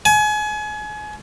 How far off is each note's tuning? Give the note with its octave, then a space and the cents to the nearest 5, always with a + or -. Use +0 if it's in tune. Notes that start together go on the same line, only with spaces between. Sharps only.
G#5 +30